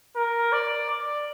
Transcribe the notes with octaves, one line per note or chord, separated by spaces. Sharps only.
A#4
D5
D5